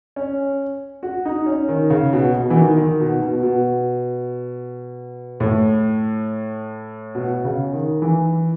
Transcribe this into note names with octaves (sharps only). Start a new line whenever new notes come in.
C#4
F#4
D#4
C#4
D#3
C#3
B2
B2
E3
D#3
D#3
B2
B2
B2
A2
B2
C#3
D#3
E3